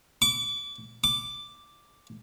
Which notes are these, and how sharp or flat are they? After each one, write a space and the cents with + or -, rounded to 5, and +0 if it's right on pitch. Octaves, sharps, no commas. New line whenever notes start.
D6 -30
D6 +0